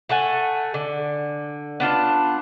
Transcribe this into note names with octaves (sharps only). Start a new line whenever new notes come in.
A3 A4 F#5 G#5
D3
B3 D4 F4 A5